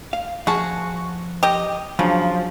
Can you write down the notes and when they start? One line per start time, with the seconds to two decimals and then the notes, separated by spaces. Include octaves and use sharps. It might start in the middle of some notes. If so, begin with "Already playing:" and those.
0.13 F5
0.47 F3 F#4 G#4 A5
1.43 G4 D#5
1.99 C#3 F3 F#3 D4